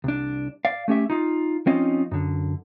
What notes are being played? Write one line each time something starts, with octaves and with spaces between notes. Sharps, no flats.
C2 D4
D5 F5
A3 C#4 G4 E5
D#4 F4
F3 C4 C#4 D#4 F4 D#5
F#2 D3